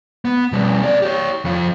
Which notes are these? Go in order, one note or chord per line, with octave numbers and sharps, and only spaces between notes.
B3
B2 G3
B3 D5
G4 C#5
F2 F4